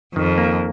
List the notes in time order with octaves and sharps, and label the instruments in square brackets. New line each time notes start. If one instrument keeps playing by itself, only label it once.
[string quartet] F2 [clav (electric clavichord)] D#3
[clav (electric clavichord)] A#3